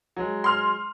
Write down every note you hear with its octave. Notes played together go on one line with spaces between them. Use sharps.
F#3 G#3
C6 F6